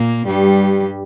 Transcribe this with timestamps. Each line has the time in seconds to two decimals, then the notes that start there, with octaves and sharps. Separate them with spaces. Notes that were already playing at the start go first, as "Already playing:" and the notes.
Already playing: A#2 A#3
0.27 G2 G3